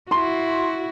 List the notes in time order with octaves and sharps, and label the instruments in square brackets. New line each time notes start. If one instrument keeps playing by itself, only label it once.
[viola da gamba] E4 F#4 [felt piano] C6